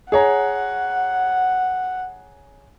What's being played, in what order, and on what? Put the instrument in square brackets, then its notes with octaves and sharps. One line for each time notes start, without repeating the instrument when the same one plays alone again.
[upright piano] G#4 C#5 A#5 [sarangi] F#5